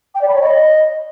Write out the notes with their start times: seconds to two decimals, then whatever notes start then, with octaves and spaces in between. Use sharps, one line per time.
0.14 G5
0.21 D5
0.27 B5
0.34 C#5
0.41 D#5